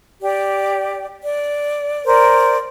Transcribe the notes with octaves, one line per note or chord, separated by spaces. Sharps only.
G4 D5
D5
A#4 C5 D5